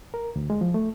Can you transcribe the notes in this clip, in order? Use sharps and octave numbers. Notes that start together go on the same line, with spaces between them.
A#4
D2
G#3
F3
A3